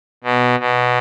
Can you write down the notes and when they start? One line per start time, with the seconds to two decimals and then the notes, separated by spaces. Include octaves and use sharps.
0.24 B2
0.60 B2